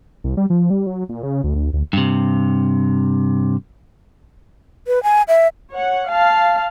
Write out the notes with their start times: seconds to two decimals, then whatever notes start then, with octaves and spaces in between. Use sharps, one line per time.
0.24 C2
0.37 G3
0.50 F3
0.70 G3
0.87 F#3
1.09 A#2
1.23 C#3
1.44 D2
1.55 D2
1.73 D2
1.93 G2 C3
4.87 B4
5.03 G#5
5.28 E5
5.72 C#5 F#5
6.07 F5 A5